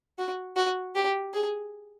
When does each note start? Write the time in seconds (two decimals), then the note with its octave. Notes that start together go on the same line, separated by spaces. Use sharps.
0.18 F#4
0.56 F#4
0.95 G4
1.34 G#4